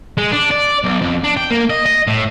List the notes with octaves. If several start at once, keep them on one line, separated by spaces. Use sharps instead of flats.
G#3
D4
D5
B1
F2
D4
G5
A#3
D#5
D#5
A2